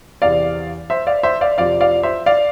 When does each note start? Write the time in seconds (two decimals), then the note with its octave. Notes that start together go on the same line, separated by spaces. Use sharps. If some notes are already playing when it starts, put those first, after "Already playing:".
0.22 E2 C3 E3 D5 F5
0.90 C5 E5
1.07 D5 F5
1.23 C5 E5
1.41 D5 F5
1.58 F2 C3 F3 D5 F5
1.81 D5 F5
2.03 C5 E5
2.26 D5 F5